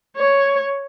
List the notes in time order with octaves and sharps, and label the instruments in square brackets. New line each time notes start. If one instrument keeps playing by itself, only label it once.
[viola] C#5